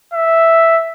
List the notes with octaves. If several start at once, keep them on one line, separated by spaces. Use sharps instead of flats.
E5